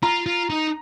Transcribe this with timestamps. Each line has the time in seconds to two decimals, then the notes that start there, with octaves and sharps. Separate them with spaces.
0.03 F4 A#5
0.26 F4
0.50 D#4